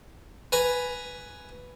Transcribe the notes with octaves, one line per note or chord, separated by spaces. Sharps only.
B4 G#5 A#5 B5